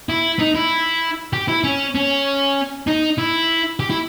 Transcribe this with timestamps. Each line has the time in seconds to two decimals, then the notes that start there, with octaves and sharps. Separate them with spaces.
0.09 E4
0.39 D#4
0.55 E4
1.33 G4
1.48 E4
1.64 C#4
1.95 C#4
2.87 D#4
3.18 E4
3.80 G4
3.90 E4